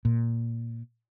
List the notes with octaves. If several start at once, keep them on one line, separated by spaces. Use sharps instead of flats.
A#2